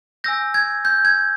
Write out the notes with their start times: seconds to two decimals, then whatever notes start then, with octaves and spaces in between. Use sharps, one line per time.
0.24 G#5 E6 G6 A#6
0.54 G#6
0.85 G6
1.05 G#6